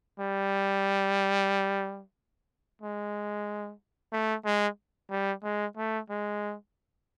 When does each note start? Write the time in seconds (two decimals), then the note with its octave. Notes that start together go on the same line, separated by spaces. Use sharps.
0.19 G3
2.81 G#3
4.12 A3
4.45 G#3
5.10 G3
5.43 G#3
5.76 A3
6.09 G#3